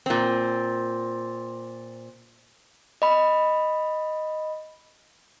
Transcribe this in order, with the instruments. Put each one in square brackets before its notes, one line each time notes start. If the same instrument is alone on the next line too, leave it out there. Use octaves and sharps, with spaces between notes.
[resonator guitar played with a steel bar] A#2 C4
[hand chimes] D#5 B5